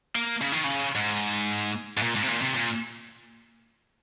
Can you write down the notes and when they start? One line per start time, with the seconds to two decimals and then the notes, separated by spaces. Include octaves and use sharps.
0.16 A#3
0.41 C#3
0.53 D#3
0.64 C#3
0.95 G#2
1.97 G#2
2.02 A#2
2.16 G#2
2.23 C3
2.28 A#2
2.41 C3
2.56 A#2